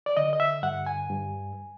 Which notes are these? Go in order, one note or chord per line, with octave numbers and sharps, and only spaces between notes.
D5
D3 D#5
D#5
E5
G2 F#5
G#5
G2